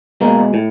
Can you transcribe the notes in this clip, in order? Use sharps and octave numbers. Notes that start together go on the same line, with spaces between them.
B2 G#3 A#3
A2